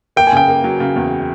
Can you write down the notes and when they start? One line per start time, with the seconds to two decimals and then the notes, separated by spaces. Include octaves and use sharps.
0.16 A#3 G5
0.27 G#5
0.33 C#3 G5
0.48 A#3
0.64 F#3
0.80 C#3
0.96 E2